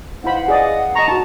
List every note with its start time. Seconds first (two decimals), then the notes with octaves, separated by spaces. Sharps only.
0.24 D#4 E4 B4 C5 F5 F#5 B5
0.48 G#4 D5 D#5
0.96 D#5 A5 A#5 C#6
1.08 D#4 F#4 A5 C#6